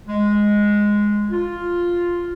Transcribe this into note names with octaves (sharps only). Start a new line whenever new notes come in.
G#3
F4